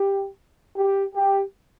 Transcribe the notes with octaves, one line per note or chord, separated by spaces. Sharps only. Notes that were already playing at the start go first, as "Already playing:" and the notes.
Already playing: G4
G4
G4